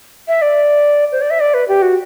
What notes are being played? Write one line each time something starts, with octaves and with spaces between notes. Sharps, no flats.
E5
D5
C5
D5
E5
D5
B4
G4
F#4